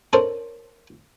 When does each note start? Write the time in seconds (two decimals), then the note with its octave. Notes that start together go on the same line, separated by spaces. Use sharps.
0.13 C#4 D4 A4 A#4 C5